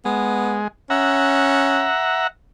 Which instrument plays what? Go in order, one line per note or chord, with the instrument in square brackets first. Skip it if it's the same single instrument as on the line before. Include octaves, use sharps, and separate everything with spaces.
[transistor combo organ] G#3 [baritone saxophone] B3
[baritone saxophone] C#4 [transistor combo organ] E5 F#5 A#5